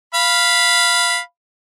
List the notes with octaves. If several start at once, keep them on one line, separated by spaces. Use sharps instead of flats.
F5 B5